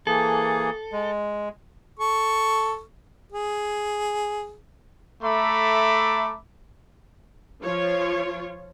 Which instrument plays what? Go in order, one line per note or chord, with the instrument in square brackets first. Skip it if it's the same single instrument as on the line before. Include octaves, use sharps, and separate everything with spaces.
[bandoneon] E3 A#3 G#4 [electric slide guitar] A4
[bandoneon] G#3
[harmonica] A4 C#6
G#4
[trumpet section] A3 A4 E5 A#5 B5 D6
[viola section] F3 F4 C#5